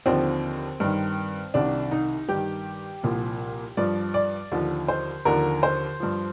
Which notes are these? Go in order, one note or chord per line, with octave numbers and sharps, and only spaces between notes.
D#2 D3 F3 C4
G2 D#3
C2 C3 D#3 D4
D#4
G2 D#3 G4
C2 A#2 F3
G2 F3 D5
D5
D#2 D3 F3
C5
D#2 D3 F3 A#4
C5
G2 F3